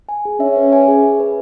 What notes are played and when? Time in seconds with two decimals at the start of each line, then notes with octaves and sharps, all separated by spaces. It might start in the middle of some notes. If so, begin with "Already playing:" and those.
0.09 G#5
0.25 G#4
0.40 C#4 E5
0.56 B4
0.73 G#5
0.88 G#4
1.03 E5
1.20 B4